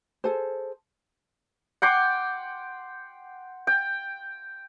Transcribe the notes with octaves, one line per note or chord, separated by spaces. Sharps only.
G#4 A4 C5
F#5 G5 C6 D6
G5